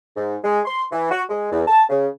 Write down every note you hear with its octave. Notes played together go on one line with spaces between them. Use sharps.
G#2
G#3
C6
E3
F#4
G#3
E2
A5
C#3